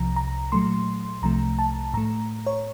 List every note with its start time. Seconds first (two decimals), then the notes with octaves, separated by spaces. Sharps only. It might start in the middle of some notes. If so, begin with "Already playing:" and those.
Already playing: C2 C3 F3 A#5
0.16 A#5
0.52 A#2 F#3 A3 C6
1.22 C2 C3 F3 A3 A#5
1.59 A5
1.94 A2 A3 A#5
2.47 C#5